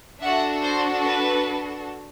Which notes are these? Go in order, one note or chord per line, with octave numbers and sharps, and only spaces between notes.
D4 F#4 A4 E5 F#5
C5
B4